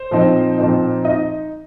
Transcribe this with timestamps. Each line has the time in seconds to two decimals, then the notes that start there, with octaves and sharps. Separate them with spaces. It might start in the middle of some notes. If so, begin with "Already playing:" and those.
Already playing: C5
0.11 A#2 F3 C4 D#4
0.58 A#2 F3 C4 D#4
1.05 D#4 D#5